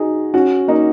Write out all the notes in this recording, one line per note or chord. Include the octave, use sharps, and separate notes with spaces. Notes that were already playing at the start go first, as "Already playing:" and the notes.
Already playing: D#4 F#4 G#4
C#4 F#4
A#3 D#4